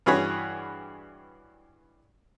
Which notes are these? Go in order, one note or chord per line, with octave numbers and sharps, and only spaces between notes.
G2 E3 F#4 G#4 C#5 B5